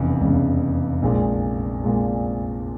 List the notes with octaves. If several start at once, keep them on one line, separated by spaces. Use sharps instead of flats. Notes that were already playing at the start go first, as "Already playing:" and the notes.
Already playing: F1 E2 C#3
F1 E2 C#3
A#1 A#2 G#3
A#2 G#3